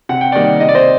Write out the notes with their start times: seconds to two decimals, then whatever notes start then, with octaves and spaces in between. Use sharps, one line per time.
0.09 C3 F#5
0.21 G5
0.32 D#3 G3 A#3 D5 F#5
0.60 C3 D#5
0.69 D5
0.75 C5 D#5